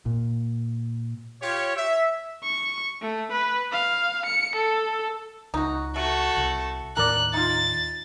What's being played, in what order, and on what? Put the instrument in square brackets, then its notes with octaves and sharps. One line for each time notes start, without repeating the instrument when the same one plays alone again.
[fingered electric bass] A#2
[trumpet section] F4 G4 C#5
E5
[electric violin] C#6
A3
B4
F5
C#7
A4
[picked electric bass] C#2 [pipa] D#4 F#4
[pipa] A3 [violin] F#4 A4
[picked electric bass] C2
[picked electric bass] D#2 A2 D#3 [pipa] A#4 D5 [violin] F#6
[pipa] D#4 F4 [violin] A6